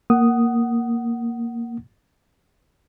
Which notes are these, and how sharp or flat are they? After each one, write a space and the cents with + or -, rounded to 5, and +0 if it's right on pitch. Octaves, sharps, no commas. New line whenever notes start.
A#3 +0 F#5 +15 D#6 +0